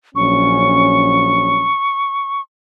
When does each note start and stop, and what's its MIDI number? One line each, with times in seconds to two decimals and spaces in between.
0.15 1.70 34
0.15 1.70 54
0.15 1.70 61
0.15 2.41 85